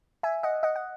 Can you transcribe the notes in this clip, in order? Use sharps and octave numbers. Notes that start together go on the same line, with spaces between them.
E5 G#5
D#5 F#5
D#5 F#5
F#5